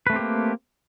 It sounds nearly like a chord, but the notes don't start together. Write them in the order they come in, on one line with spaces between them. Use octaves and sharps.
B4 A3 C4 G4 A#3